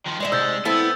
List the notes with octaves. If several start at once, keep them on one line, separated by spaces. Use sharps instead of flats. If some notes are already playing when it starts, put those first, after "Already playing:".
D#3 F3
G3 G#3 C#5 E5
G#2 C3 E6 G6 A6
B3 C4 E4 A4 E5